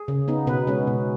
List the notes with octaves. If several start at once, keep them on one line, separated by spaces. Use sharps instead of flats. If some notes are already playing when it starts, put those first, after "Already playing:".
Already playing: G#4
C#3
B3 D#4
B2 B4
G#3 C#4
B2